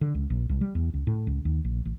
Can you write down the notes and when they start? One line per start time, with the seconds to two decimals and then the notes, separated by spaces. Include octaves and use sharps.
0.01 D3
0.15 C#2
0.30 A#1
0.49 C2
0.61 G3
0.75 E2
0.94 C#2
1.07 A2
1.27 C#2
1.45 D#2
1.65 A#1
1.85 A1